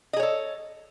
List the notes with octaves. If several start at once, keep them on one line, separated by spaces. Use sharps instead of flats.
G#4 A4 C#5 D#5